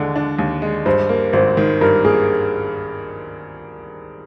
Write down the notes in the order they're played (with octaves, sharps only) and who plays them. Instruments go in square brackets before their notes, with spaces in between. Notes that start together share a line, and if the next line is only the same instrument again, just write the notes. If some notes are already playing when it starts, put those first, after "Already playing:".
Already playing: [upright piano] D#2 D3 G#3 D4
D4
D#2
G#3
[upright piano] G2 [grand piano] C5
[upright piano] A#3
[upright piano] G#1 [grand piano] C5
[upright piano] D#3
[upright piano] G2 [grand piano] A#4
[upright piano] A#3 [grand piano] G#4